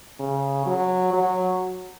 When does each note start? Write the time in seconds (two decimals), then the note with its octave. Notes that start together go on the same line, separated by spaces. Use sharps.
0.20 C#3
0.66 F#3
1.13 F#3